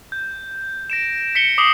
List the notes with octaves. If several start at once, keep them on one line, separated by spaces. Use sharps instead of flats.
G6
A#6 D7 E7
B6 C#7 G7
D6 D#6 C7 F#7 G7